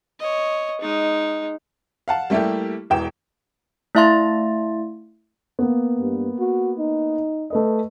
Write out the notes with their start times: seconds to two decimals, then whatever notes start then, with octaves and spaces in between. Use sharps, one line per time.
0.19 C#5 D#5
0.81 G#3 D#4
2.08 F5 F#5 A5
2.30 G3 A3 A#3 E4 G4
2.90 E1 E2 G5 E7
3.95 A3 E4 E5 F5 C6 A6
5.59 A#3 B3
5.99 G2
6.39 F#4
6.78 D#4
7.50 A3 B4 D#5